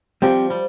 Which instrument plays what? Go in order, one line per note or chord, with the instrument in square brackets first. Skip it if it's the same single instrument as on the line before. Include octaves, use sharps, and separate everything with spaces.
[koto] F3 [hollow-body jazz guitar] G3 C4 G4
[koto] G3